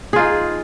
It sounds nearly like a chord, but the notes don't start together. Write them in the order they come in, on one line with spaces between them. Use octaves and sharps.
G#4 F4 D#4